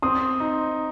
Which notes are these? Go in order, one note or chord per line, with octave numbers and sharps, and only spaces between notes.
C4 C6 D#6
D#4